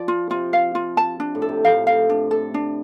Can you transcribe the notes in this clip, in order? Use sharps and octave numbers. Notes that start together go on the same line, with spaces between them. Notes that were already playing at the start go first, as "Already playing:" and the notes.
Already playing: F3 D5
F4
C3 F4
F5
F4
A5
D4
A2
A4
C3
A2 F5
F5
D4
A4
D4